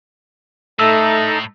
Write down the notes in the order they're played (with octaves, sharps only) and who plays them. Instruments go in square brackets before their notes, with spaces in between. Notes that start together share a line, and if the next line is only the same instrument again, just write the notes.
[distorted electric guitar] A2 [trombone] A3 [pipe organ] D#4 A4 A#5 [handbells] E6